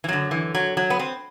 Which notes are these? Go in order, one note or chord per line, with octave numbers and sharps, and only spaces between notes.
E3
F#2 D3 F#3
E3
F#3
F#3
B3
C4